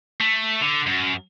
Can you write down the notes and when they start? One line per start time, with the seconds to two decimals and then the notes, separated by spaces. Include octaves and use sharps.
0.20 A3
0.61 D3
0.86 F#2